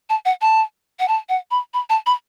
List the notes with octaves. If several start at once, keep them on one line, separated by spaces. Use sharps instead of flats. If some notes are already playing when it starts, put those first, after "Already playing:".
A5
F#5
A5
F#5
A5
F#5
B5
B5
A5
B5